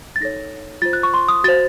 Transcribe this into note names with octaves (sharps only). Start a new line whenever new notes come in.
A6
D#4 A4 C#5 A#6
F4 C5 A6
F#6
C#6
C6
D#6
F#4 C5 A6